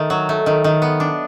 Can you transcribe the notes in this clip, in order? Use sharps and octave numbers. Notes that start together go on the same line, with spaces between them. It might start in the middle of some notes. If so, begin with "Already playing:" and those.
Already playing: D#3 A3
F#3
A3
D#3
D#3
B3
D4